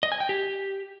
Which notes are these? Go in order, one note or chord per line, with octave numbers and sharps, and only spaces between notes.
D#5
G#5
G5
G4